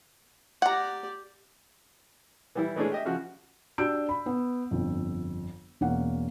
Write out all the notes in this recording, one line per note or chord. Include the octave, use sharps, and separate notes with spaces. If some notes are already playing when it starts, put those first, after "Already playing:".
G4 D5 F#5 A#5
E3 G3 E4
E3 G#3 A3 C#4 D4 G#4
G4 D#5 E5
C#3 F3 F#4
D4 F#4 G4 E6 G6 D7
B5
B3
G1 F2
E1 A#3 C#4 F#5